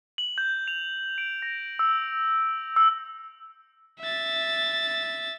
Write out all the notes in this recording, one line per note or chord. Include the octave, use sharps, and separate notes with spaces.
F#7
G6
F7
D7
A#6
E6
E6
E5 A6